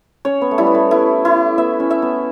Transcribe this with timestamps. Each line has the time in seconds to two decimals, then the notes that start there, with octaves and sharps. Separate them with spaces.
0.25 C#4 C#5
0.41 B3
0.51 A3
0.58 G3 E4
0.67 B3
0.75 A3
0.91 B3 E4
1.25 A3 E4
1.58 B3 E5
1.80 C#4
1.91 E5
2.02 B3